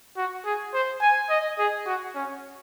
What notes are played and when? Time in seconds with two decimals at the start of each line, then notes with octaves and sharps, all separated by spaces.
0.17 F#4
0.45 G#4
0.73 C5
1.01 G#5
1.30 D#5
1.58 G#4
1.86 F#4
2.15 C#4